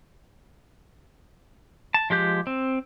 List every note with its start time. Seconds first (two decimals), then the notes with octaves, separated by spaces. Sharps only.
1.94 A5
2.10 F3 G#3 G4 G6
2.47 C4